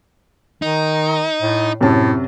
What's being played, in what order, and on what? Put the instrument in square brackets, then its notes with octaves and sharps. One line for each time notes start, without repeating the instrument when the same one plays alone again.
[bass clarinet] D#3 [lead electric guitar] D#4
[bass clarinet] A2
[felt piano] F#2 C3 A5 [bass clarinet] A2